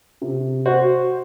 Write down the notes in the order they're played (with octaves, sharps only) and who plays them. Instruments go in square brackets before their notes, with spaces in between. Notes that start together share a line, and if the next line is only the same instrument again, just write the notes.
[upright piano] C3
[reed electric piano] F#4 [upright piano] C5